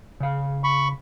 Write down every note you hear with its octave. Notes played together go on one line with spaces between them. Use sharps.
C#3 F5
B5 C#6